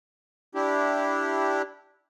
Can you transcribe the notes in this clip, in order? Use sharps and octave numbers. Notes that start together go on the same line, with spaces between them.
D4 E4 G4